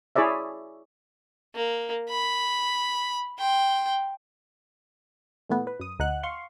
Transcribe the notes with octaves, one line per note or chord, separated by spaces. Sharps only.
E4 G#4 C#5 D5 E5
A#3
B5
G5 C6
A#2 E3 A3 B3
B4
F#2 D#6
D2 D#4 F#5 F#6
F5 C6 C#6